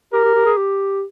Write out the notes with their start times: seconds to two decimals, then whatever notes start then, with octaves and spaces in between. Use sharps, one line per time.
0.12 G4 A#4
0.25 G4
0.35 G4
0.45 G#4
0.57 G4